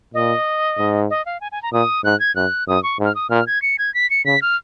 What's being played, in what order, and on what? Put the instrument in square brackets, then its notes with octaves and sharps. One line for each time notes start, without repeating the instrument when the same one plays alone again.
[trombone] A#2 [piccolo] D#5
[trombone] G#2
[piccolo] D#5
F5
G#5
G#5
A#5
[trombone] A#2 [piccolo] D#6
[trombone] G#2 [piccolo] F#6
[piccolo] G#6
[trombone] F#2 [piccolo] F#6
[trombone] F#2 [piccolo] D#6
[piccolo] C#6
[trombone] G#2
[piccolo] F6
D#6
[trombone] A#2 [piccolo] F6
[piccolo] G#6
C#7
G#6
B6
C#7
[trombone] C#3 [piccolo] B6
[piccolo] F6